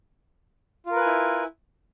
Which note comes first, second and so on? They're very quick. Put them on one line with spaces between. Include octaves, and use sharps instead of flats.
F4 A#4 B4 G#5 E4